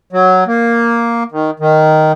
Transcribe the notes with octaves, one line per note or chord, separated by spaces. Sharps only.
F#3
A#3
D#3
D#3